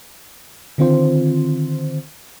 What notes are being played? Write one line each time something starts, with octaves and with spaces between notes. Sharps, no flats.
D3 D#3 C4 F4 C5